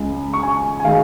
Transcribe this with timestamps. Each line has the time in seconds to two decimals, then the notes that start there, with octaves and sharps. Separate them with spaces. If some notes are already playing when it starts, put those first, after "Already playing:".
Already playing: C#2 C#3 G#3
0.34 C#6
0.43 G#5
0.80 G#5
0.84 D#3 G#3 F5